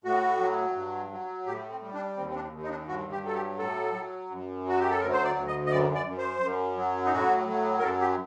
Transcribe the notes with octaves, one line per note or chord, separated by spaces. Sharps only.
A2 F#4
F#3
G2
F#3
A2 G4
C4
G3
D4
D#2 C4
C4
D4
D#2
D#4
D4
G2 F#4
G4
F#3 A4
G4
A2 A4
F#3
F#2
F#3 F#4
G4
A4
D2 A#4
C5
D5
D2
D#5
D#5
F#2 D5
D5
F#2
C5
F#2
F#3
D#4
A2 F#4
F#3
A#4
F#2 A4
G4